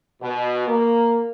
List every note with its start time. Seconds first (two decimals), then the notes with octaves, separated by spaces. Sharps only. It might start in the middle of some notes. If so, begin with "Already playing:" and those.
0.23 B2
0.68 A#3